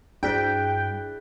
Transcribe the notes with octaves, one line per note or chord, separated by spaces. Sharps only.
G2 D4 E4 G#4 D5 G5 F#6 B6